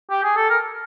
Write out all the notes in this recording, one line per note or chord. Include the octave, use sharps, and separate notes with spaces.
G4
G#4
A4
A#4